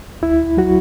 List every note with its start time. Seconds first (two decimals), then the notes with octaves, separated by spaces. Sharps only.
0.22 D2 E4
0.57 F#3 F#4